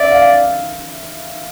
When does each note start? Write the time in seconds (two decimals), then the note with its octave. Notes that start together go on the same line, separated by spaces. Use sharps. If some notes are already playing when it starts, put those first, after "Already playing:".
Already playing: D5 E5
0.11 F5